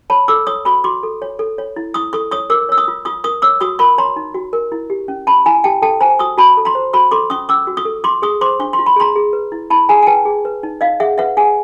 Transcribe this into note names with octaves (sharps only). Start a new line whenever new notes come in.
C#5 A5 B5
A4 D6 E6
C#5 C#6 D#6
F#4 B5 C#6
F#4 C6 D6
A4
C#5
A4
C#5
E4
E4 C#6 D#6
A4 C#6 D#6
C#5 C#6 D#6
A#4 D6 E6
C#5 E6
C#6 D#6
F4
F4 C#6 D#6
A#4 C#6 D#6
C#5 D6 E6
F#4 C#6 D#6
A#4 B5 C#6
C#5 A#5 C6
D#4
F#4
A#4
E4
G4
C#4
C#4 A5 B5
E4 G#5 A#5
G4 G5 A5
A4 G5 A5
C5 G#5 A#5
F#4 C#6 D#6
F#4 A5 B5
A4
A#5 C6
C5
F#4 B5 C#6
A4 C6 D6
C#4 C#6 D#6
C#4 D6 E6
F#4
C#6 D#6
A4
F4 C6 D6
G#4 C#6 D#6
C5 C6 D6
D4 C#6
C6
F4
B5
G#4 A#5 C6
G#4
B4
E4
E4 A5 B5
G#4 G#5 A#5
G#5
B4 G5 A5
G#4
B4
D#4
D#4 D#5 F5
G#4 E5 F#5
B4 E5 F#5
G#4 F#5 G#5